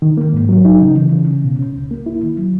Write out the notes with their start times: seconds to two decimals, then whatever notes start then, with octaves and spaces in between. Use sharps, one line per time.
0.02 D#3
0.17 A#3
0.33 G#2
0.49 F#3
0.65 D#4
0.81 C#3
0.96 E3
1.12 C#3
1.28 C#3
1.44 B2
1.59 C#4
1.75 C#2
1.91 A#3
2.06 E4
2.22 D#3
2.38 F#3